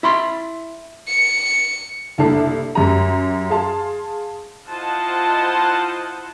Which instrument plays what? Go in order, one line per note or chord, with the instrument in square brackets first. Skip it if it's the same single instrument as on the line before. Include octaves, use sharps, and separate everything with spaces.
[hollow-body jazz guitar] E4 B5 C6
[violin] C#7
[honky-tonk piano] F#1 C2 A3 D4 A5 C7
F#2 G4 A#5
G#4 F5 A5 C6
[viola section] E4 F4 C5 D#5 F#5 A5